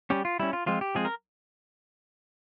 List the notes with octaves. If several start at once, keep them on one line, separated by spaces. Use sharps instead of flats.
G3 C#4 G4
F4
G3 C#4 E4
F4
F3 G#3 C4 F4
G4
F3 G#3 C4 G#4
A#4